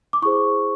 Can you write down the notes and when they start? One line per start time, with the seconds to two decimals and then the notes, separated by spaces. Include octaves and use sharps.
0.13 D6
0.22 E4 G#4 C5 C#6